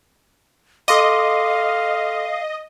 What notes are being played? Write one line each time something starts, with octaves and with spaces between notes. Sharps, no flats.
A4 D#5 F5 C6 D6